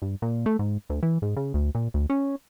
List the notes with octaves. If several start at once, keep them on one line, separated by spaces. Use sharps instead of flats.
G2
A#2
A3
G#2
D2
E3
G#2
C#3
D2
A#2
D2
C#4